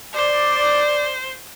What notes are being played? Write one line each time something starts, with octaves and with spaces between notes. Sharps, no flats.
C5 D5